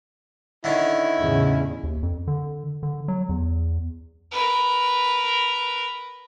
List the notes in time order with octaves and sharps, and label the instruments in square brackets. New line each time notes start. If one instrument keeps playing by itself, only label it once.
[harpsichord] D3 D#3 C#4 [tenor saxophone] E4
[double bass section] E2 A2 C#3
[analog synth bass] D#2
F2
D3
D3
F#3
E2
[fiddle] A#4 B4